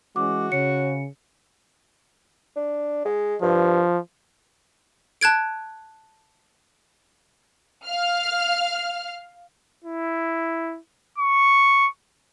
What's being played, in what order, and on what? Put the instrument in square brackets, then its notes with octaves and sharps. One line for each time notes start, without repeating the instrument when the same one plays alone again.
[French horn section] E3 G#3 C#4 [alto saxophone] F#4 [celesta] D6
[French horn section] C#3 [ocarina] C#5 [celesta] C#7
[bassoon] D4
G#3
[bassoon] G2 [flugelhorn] F3
[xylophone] A5 F#6 G#6 D7
[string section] F5 F6
[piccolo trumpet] E4
C#6